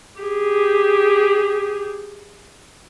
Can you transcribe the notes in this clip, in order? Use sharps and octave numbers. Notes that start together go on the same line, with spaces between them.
G4 G#4